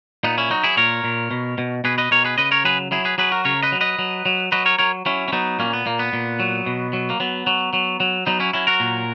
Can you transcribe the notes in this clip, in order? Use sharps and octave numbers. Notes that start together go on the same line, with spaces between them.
A#2 B3 D#4
C#4 E4
F#3 D#4 F#4
E4 G#4
A#2 A#4 C#5
A#2
B2
B2
B2 G#4 B4
B4 D#5
B2 A#4 C#5
G#4 B4
C#3 B4 D#5
A#4 C#5
F#3 G#4 B4
F#3 E4 G#4
G#4 B4
F#3 G#4 B4
F#4 A#4
C#3 A#4 C#5
B4 D#5
F#3
B4 D#5
F#3
F#3
F#3 B4 D#5
A#4 C#5
F#3 A#4 C#5
F#3 C#4 E4
C#4
F#3 B3 D#4
A#2 A#3 C#4
B3
A#2 A#3
B3
A#2
F#3
B2
F#3
A#3
F#3 B3
F#3
F#3
F#3
F#3 B3 D#4
C#4 E4
F#3 C#4 E4
F#4 A#4
A#2